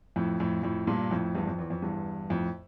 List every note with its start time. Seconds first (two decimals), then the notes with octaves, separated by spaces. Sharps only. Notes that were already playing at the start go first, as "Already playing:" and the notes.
0.16 F2 A2
0.40 F2 A2
0.63 F2 A2
0.87 G2 A#2
1.11 F2 A2
1.35 E2 G2
1.47 F2
1.59 E2
1.70 F2
1.82 E2 G2
2.30 F2 A2